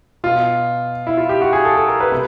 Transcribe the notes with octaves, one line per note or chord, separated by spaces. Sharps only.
B2 F4
E4
F4
G4
F#4
G#4
A4
A4
A#4
B4
C3